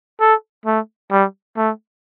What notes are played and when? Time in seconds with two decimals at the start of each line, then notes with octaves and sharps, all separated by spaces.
0.20 A4
0.66 A3
1.11 G3
1.57 A3